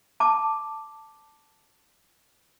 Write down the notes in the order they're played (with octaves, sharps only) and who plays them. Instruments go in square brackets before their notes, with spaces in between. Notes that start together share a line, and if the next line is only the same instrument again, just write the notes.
[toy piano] A5 D6